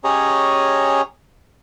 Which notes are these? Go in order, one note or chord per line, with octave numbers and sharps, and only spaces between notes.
C#4 G4 G#4 C#5 D#5 A#5